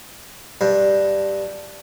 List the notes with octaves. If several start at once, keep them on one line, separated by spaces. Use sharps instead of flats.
G2